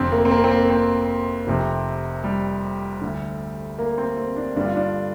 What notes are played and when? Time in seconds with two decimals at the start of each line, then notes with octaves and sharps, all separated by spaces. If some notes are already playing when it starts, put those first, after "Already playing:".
Already playing: F1 F2 D3 C4
0.12 A#3
0.25 C4
0.31 A#3
0.44 C4
0.51 A#3
0.70 C4
1.47 F1 F2 C3
2.24 G3
3.01 D2 D3
3.79 A#3
3.98 C4
4.17 C4
4.36 D4
4.56 G1 G2 D3 D4
4.65 F4
4.76 D4